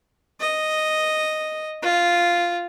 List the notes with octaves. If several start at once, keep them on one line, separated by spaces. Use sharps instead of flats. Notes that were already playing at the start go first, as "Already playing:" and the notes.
D#5
F4